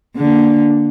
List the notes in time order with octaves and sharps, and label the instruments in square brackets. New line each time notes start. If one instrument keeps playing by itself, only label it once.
[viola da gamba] D3 A#3